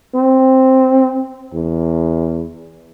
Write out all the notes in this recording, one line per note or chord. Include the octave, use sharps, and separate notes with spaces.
C4
E2